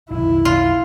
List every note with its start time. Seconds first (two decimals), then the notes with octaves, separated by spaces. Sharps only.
0.10 B1 F2 D#3 E4
0.45 F4